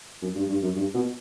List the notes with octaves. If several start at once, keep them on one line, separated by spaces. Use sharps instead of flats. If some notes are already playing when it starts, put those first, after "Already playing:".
F#2
G2
G2
F#2
G2
B2